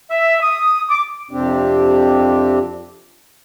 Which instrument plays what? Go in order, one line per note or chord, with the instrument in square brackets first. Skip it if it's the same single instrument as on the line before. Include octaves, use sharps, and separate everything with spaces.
[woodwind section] E5
D#6
D6
[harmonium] F2 C3 C4 D4 G4